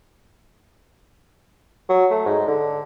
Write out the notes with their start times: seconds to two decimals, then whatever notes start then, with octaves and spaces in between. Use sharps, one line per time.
1.89 F#3
2.11 A3
2.26 G#2
2.48 D3